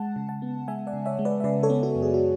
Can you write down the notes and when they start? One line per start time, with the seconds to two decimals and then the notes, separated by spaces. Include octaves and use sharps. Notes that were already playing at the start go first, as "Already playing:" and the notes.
Already playing: G#3 F#5 A5
0.16 C#3
0.29 F#5 A5
0.42 B3
0.68 G#3 E5 G#5
0.87 D5 F#5
0.93 C#3
1.06 C#5 E5
1.19 G#3
1.25 B4 D5
1.40 E5
1.44 C#3 B4 D5
1.63 A4 C#5
1.70 B3
1.83 F#4 A4
1.95 F#2
2.02 G#4
2.14 F#4